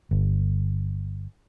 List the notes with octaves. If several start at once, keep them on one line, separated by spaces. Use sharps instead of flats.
G1